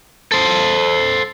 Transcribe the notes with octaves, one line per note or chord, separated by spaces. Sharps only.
A4 C5